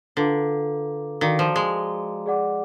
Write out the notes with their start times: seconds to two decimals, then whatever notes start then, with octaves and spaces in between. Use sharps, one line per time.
0.16 D3 F4 B4 F5 A#5 D6
1.21 D#3 F#4 D5 F5 A#5 D6
1.39 F3
1.56 G#3
2.26 G#4 D5 F#5 D6